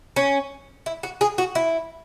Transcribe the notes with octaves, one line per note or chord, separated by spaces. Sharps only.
C#4
E4
F#4
G#4
F#4
E4